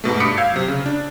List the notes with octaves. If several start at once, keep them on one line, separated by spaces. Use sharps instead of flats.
G#2 B2 A3
G2 D6 D#6 B6 C#7 D7
F5 E6 G6 G#6 C7
C3 F#3
C#3
D4